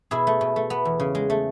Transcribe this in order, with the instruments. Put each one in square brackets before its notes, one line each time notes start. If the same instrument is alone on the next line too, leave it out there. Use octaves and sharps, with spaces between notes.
[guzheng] B2 E4 G#4
A3
B2
A3
B3
E2
C#3
G#3
A3